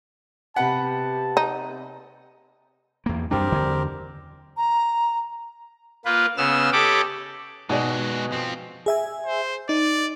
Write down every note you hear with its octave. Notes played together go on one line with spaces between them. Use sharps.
C3 B3 G4 B4 F#5 A5
D#4
E2 A#3
F#2 G3 C4 D4 G4 A#4
E2 D3
A#5
A#3 F4 B4
C#3 B3 E6 F6
G4 A4 C#5 D#5 B5 D6
B2 G#3 D#4 F#4 G#4 D5
F3 C4
G#4 E5 G#5
C5
D#4 D5